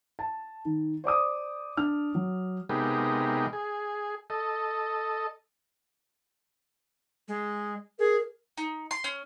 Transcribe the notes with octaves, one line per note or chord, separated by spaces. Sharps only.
A5
D#3
C5 D5 D6 D#6
D4 F6
F#3
C3 G#3 B3 D#4 G4 A#4
G#4
A4 D#5
G#3
G#4 A#4
D#4
C6
C#4